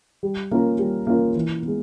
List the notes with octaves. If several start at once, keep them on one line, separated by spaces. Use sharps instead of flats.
G3
A#3 C#4 F4 A#4
G3
A#3 C#4 F4 A#4
E3
G#3 B3